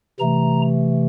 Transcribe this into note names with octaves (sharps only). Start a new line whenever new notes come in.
C3 E3 A3 A#5